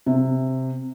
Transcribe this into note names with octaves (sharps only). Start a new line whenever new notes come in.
C3